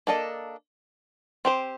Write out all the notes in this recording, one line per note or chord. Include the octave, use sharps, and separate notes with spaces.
A#3 D4 A4 D#5
C4 G4 C5